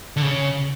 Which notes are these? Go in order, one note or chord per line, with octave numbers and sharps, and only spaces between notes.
D3
C#3